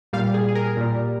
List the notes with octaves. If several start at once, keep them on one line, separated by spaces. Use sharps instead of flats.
A#2 G3 F5
G#4
G#4
A#4
A#2 G3